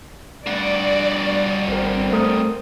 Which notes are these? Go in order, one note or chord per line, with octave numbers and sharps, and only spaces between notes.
G2 F#4 D5
G#1 C4 A#4
A3 A#4 D#6